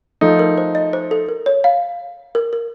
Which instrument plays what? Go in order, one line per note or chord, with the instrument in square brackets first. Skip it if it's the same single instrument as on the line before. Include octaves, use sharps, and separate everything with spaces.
[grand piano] F3 A3 D#4 [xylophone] A4
[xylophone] A#4
C5
D#5
C5
A4
A#4
C#5
F5
A#4
A#4